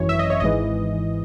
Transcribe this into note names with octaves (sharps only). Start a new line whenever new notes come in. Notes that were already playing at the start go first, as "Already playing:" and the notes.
Already playing: G#1 F#2 E3 C#5
E5
D#5
C#5
G#1 G#2 E3 D#5